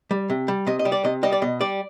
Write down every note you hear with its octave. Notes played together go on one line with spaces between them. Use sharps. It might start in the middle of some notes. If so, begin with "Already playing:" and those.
G3
C3
G3
C3 D#5
D#5
G3
D5
C3 D#5
G3 D#5
D5
B2 D#5
G3 D5